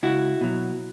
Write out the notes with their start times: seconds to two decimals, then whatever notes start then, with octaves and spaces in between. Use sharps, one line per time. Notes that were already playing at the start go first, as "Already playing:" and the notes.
0.03 C#2 E4 F#4
0.41 B2 F#3